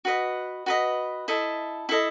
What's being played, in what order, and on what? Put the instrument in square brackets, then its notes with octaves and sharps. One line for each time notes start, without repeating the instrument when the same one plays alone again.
[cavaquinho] F#4 B4 D#5
F#4 B4 D#5
E4 A4 D#5
E4 A4 D#5